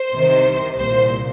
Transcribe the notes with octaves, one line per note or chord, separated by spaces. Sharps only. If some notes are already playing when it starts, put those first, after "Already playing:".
Already playing: C5
C2 C3 D#3
C2 A#2 C5